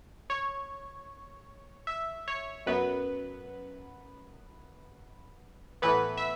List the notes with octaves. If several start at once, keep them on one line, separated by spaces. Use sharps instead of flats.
C#5
E5
C#5
F#2 F#3 B3 B4
A2 E3 B3 B4
E5